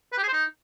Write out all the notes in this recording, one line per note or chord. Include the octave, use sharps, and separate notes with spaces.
B4
G4
G#4
C5
D#4